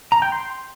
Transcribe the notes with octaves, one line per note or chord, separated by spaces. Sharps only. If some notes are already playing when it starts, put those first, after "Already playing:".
A#5
G5
C6